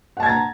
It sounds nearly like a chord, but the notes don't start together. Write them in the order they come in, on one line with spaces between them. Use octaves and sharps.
F#5 A5 G#6 A6 A#5